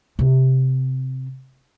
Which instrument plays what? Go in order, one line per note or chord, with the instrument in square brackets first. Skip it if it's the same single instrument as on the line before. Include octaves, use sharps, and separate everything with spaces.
[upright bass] C3 C4